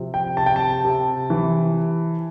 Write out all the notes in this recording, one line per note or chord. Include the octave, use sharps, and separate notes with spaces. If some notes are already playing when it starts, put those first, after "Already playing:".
Already playing: C3 F3
G5
C3 A5
G5
A5
C3
E3